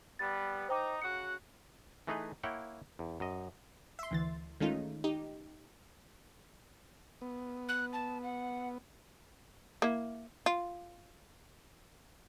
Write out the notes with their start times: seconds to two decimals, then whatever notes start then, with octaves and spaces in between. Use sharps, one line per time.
0.19 G3 B3 A6
0.69 D#4 C5 G5 D6
1.02 C#3 F#4 F#5 C#7
2.07 E3 A3 D#4 G#4 B4 D#5
2.43 A#3 E4 C#5 F#5 G5
2.99 E2
3.20 F#2 D#5
3.99 E5 C6
4.11 D2 E3 A6
4.60 D#3 G#3 A3 C#4 D#4 F4
5.04 D#4 G4
7.22 B3
7.69 F#6
7.93 A5
8.23 F#5
9.82 A#3 E4
10.46 F4